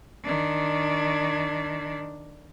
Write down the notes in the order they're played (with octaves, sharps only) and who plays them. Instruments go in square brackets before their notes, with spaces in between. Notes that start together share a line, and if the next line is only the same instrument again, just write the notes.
[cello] D#3 D4